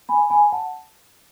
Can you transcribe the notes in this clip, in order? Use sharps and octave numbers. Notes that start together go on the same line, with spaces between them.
G#5 B5
G#5 B5
F#5 A5